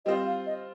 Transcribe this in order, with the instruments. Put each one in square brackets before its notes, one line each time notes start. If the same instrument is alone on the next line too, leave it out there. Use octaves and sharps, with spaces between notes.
[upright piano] G3 C4 F4 C5 [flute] D#5
[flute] F5
D#5